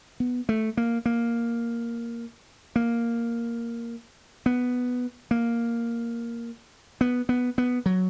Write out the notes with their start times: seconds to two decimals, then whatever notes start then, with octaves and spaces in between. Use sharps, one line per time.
0.20 B3
0.49 A3
0.77 A#3
1.06 A#3
2.76 A#3
4.46 B3
5.31 A#3
7.01 B3
7.29 B3
7.58 B3
7.86 F#3